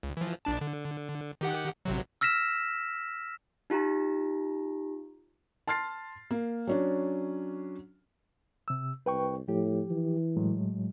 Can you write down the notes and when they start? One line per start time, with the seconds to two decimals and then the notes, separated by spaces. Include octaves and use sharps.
0.03 C#2
0.17 E3 F3
0.45 A#1 D4 A5
0.61 D3
1.41 D#3 G4 F#5
1.85 A1 C3 F#3
2.21 E6 F6 A#6 B6 E7
3.70 D#4 F4 G4 A#5
5.68 A5 C6 F6 A6 C7
6.31 A#3
6.67 F#3 C#4 D4
8.68 C3 E6
9.06 C2 B4 G5 C#6
9.48 A2 F3 G4
9.90 E3
10.37 A2 F#3 G#3